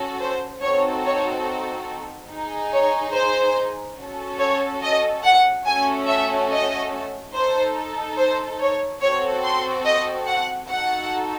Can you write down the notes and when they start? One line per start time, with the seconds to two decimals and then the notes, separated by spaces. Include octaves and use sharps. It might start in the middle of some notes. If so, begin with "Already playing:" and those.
Already playing: C#4 F#4 A4
0.21 C5
0.63 C4 D#4 F#4 A4 C#5
1.05 C#5
2.30 D#4 G#4
2.72 C#5
3.15 C5
3.98 C#4 F#4 A4
4.40 C#5
4.83 D#5
5.24 F#5
5.66 A3 C#4 F#4 A4 G#5
6.07 E5
6.50 D#5
7.34 D#4 A4 C5
8.18 C5
8.60 C#5
9.01 C4 F#4 A4 C#5
9.44 C6
9.85 D#5
10.27 F#5
10.70 D#4 F#4 A4 F#5